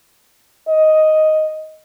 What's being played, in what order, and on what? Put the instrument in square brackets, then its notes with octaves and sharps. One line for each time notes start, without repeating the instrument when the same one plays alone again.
[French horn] D#5